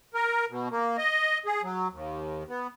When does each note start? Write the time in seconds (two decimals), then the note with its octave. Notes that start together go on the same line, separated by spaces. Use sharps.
0.14 A#4
0.50 B2
0.71 A#3
0.98 D#5
1.46 G#4
1.63 F#3
1.92 D#2
2.49 B3